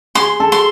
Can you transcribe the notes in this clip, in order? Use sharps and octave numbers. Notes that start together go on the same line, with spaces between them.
G#4 C6
A4
C6